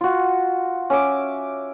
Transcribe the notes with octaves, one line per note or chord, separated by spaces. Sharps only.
F4 F#4
C#4 E5 D6